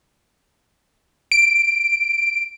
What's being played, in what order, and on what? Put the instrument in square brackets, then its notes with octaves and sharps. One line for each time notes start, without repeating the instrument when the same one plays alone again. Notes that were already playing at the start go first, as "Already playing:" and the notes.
[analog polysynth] D7